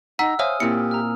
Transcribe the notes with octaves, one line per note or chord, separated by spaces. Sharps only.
D#4 F#5 A#5 E6 B6
C5 C#5 E5 F5 G#5 D#6 F6
A#2 C4 E4 G4 C#7
A#5 F6